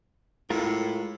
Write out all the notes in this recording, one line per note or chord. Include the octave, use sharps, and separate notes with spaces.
A2 G#3 F4 A#4